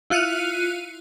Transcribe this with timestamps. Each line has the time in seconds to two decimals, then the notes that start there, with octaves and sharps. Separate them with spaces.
0.10 E4 F4 F#6 C#7 D#7 F7